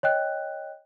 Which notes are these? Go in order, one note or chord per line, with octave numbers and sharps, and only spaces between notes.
C#5 D#5 G5 F#6